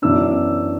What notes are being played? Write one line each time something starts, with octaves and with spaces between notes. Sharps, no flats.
F#2 E3 B3 D4 E6